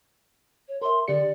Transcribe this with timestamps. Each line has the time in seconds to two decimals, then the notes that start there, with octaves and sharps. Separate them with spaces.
0.68 C#5
0.82 A#4 E5 C6
1.08 D3 G4 D5 C#7